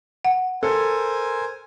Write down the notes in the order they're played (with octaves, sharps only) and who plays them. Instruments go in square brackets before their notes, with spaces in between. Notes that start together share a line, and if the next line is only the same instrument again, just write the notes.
[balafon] F#5
[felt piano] A4 [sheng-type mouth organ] A#4 C5 G#5